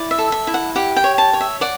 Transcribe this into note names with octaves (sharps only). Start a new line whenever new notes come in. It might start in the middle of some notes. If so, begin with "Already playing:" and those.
Already playing: E4 D5
E5
A4
E5
E4
F#5
G4 F#5
G5
C#5
A5
C#5
E5
D5 F#5